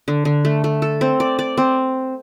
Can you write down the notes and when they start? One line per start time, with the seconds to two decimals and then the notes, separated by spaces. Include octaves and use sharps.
0.08 D3
0.25 D3
0.45 A3
0.64 A3
0.82 A4
1.01 C4
1.20 D5
1.39 D5
1.57 C4